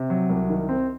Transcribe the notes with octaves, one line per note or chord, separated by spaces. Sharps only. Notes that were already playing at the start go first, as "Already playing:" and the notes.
Already playing: C3
F#3
C2
D#3
C4